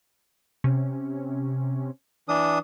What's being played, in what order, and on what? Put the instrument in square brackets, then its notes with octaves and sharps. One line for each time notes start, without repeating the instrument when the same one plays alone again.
[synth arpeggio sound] C3 C#4
[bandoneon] E3 D4 D#6